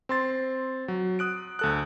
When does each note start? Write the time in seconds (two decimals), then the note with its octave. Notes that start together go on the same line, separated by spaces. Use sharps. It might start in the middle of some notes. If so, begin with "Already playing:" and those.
0.09 C4 C6 A6
0.88 F#3
1.19 D#6 F#6 D7
1.59 D2 A4 F#6